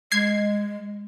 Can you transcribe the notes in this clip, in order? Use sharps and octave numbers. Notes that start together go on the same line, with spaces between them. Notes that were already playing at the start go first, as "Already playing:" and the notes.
G#3 G#6 C7